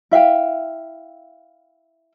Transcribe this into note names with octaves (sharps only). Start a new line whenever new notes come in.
E4 E5 F5 G5